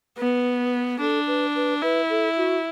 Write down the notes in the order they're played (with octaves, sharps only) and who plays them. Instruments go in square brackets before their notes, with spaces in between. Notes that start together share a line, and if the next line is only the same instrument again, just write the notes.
[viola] B3 [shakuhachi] B4
[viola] D4 [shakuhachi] A4
[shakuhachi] B4
B4
[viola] E4 [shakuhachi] B4
[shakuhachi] A4
F#4